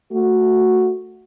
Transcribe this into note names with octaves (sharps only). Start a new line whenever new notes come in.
A3 F#4